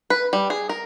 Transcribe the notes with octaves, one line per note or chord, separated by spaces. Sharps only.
B4
G3
G#4
A#4